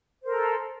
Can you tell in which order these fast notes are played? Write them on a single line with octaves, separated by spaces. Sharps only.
C5 A#4 A4